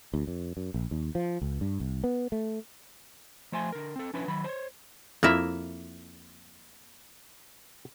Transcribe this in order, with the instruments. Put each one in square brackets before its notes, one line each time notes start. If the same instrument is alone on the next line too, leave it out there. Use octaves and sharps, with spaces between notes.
[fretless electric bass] D2
F2
F#2
A#1
D#2
F3
C#2
G2
C2
B3
A3
[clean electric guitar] F3 A3 C5 E5 G#5 C6
D3 A#4
C4 A4
F3 C#4 D4 E4 B4
D#3 F#3 B5
C5 C#5
[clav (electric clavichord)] F2 E4 [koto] A#3 A#4 E5